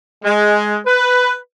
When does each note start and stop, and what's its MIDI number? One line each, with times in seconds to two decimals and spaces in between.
0.22 0.77 56
0.86 1.33 71